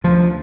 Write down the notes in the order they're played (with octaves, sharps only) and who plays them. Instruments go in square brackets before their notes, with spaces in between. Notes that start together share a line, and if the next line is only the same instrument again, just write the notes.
[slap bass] D2 F3